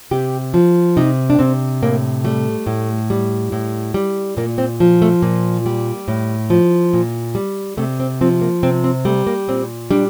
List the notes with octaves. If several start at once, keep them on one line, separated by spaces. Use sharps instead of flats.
C3 G4
F3
C3 D#4
D4
C3 C4
A2 A#3
G3 A3
A2
G3
A2
G3
A#2 A#3
C4
F3
A3
A#2 A#3
G3
A2
F3
A#2
G3
C3 A3
C4
F3 C4
A#3
C3 C4
C4
G3 A3
A#3
A#2 C4
G3 D4